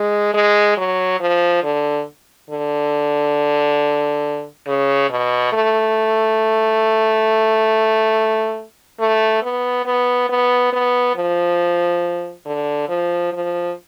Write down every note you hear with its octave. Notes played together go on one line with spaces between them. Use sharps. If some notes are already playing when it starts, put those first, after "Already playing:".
Already playing: G#3
G#3
F#3
F3
D3
D3
C#3
B2
A3
A3
B3
B3
B3
B3
F3
D3
F3
F3